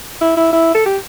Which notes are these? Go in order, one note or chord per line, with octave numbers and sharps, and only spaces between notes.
E4
E4
E4
A4
G4